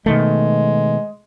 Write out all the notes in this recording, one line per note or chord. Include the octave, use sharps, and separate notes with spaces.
B2 D#3 G#3 A3